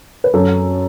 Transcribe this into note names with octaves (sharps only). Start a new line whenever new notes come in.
B4
F#2 A4